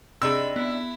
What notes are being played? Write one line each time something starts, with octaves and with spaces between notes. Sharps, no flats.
C3 D4 D#4 G#4 B5 C6 E6 A#6
B3 E4